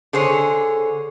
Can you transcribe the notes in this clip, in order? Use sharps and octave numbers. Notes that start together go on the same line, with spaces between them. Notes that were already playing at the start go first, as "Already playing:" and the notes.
D3 G#4 C5 C#5